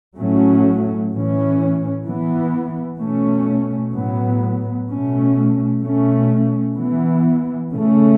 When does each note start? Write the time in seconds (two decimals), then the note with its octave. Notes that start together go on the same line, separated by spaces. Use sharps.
0.17 A2 F#3 A3 C#4
1.11 A2 E3 C#4
2.05 E3 B3
3.00 B2 A3 C#4
3.94 A2 F#3 B3
4.88 B2 A3 C#4
5.82 B2 A3 C#4
6.76 E3 B3
7.71 C#3 A3 C#4